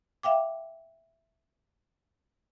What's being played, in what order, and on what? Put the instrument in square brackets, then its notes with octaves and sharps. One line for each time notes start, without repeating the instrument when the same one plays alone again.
[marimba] E5 F5 G5 D6